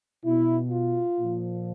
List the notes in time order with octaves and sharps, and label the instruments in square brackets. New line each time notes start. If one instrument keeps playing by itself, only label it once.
[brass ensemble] B2 E4
F4
A#2 F3